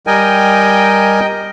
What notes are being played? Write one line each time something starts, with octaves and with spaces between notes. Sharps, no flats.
G3 A#4 D#5 G5 G#5